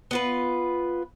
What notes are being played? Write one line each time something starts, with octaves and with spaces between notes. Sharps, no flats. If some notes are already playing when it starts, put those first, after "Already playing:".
B3 F4 B4